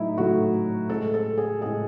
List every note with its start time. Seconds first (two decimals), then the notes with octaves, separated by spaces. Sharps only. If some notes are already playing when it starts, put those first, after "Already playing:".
Already playing: A2 F#3 A3 D#4 E4
0.18 A2 F#3 A3 F#4
0.90 A2 G#3 A4
1.14 A4
1.38 G#4
1.61 A2 G#3 G#4